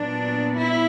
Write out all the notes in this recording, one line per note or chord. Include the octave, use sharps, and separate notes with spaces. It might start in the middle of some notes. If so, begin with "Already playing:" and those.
Already playing: A#2 F#3 B3 D4
E4